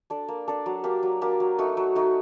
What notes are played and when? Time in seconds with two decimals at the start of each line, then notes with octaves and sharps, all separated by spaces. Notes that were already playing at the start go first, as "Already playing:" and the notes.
0.10 D4 A4 D5
0.28 A#3
0.48 D4 A4 D5
0.66 F#3
0.84 A#3 D4 G4
1.03 F#3
1.21 A#3 D4 G4
1.40 F#3
1.58 A3 D#4 F#4
1.77 F#3
1.95 A3 D#4 F#4